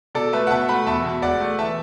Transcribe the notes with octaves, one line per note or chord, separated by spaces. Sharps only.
B2 A4 D5
A3 B4 E5
F#5
B2 E5 A5
A3 F#5 B5
E2 E5 A5
B2
E1 D5 F#5
A3
E3 E5 A5